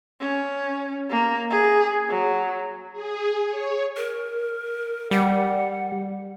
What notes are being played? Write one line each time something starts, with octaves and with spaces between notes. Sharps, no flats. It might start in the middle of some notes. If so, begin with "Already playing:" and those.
C#4
A#3
G#4
F#3
G#4
C#5
A#4
G3 F#5